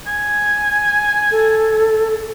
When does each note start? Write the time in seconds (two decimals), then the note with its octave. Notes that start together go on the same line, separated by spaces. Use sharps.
0.07 G#5
1.31 A4